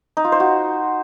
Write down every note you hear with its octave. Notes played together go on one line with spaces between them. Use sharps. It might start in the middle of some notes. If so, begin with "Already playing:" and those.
D#4
F4
C5
F#4